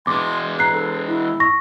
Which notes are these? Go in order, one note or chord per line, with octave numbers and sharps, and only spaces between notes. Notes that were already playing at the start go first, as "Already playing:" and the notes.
E2 G#3 C6 D6
A#5 F#6 C7
A4
E4
C#6 A#6